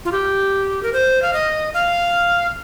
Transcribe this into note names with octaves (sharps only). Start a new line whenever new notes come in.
F4
G4
A#4
C5
F5
D#5
F5